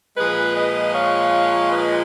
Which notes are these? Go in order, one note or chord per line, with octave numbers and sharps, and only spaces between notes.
A#2 F3 G#3 G#4 B4
B4 D#5
C#5 F5
B4 D#5